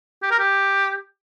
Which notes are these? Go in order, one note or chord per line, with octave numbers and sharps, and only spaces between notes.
G4
A#4
G4